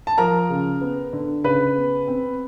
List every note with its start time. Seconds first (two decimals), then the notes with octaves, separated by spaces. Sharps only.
0.07 A5
0.18 F3 A#4 A#5
0.50 C#3
0.81 B3
1.13 D3
1.44 C#3 B4 B5
1.76 B3
2.08 C4